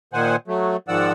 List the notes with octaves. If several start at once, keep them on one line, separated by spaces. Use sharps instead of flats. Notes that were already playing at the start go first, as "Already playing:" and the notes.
A#2 D#3 C5 F#5 G#5
F#3 A3
G#2 D#3 F3 D5 F#5 E6